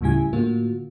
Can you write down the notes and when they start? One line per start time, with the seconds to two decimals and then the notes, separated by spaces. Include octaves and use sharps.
0.01 D2 A2 C#3 G3 E4 G#5
0.33 A2 D3 A#3 F4 F#4